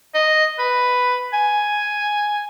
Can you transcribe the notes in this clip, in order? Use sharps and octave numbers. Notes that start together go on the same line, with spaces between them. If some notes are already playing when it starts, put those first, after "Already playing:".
D#5
B4
G#5